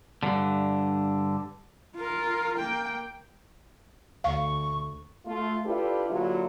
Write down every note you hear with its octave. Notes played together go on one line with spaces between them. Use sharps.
G2 D3
F4 A#4
A#3 G5
D2 F5 C#6
A3 F4
D4 E4 F4 G4 A4 B4
D3 F#3 A#3 E4 F4 G4